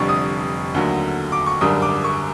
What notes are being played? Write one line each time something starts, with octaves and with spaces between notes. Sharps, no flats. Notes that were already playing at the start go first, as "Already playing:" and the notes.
Already playing: F1 F2 D3 G3 C#6
D#6
D#2 D3 F#3 A3
D6
C#6
G#1 F#2 D3 G3 D#6
D6
C#6